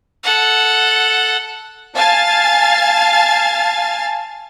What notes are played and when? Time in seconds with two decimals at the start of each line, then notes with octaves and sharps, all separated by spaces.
0.24 A4 F#5
1.97 F5 G#5 A5 A6